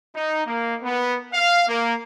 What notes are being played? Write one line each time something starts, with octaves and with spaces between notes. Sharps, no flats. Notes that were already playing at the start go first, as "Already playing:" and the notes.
D#4
A#3
B3
F5
A#3